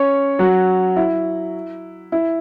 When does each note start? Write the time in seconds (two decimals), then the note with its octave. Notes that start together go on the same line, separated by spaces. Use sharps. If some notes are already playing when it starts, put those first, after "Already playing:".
Already playing: C#4 C#5
0.39 F#3 F#4
0.96 E4
2.12 E4